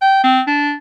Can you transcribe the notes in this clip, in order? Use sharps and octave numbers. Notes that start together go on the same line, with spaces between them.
G5
C4
D4